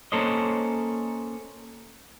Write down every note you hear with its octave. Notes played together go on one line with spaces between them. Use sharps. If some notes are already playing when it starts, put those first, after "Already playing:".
A#3 C#4 A4 C5 D#5